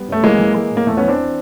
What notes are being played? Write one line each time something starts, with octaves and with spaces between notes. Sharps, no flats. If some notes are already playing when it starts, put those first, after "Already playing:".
Already playing: G3 B3
F#2 A3
E3 G#3 A#3
E3
G#3
A2
A#3
E2 A3
B3 C#4
E3 C4 D4